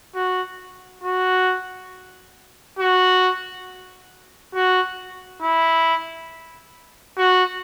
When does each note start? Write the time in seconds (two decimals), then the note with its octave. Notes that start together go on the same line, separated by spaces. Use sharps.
0.15 F#4
1.03 F#4
2.79 F#4
4.54 F#4
5.42 E4
7.17 F#4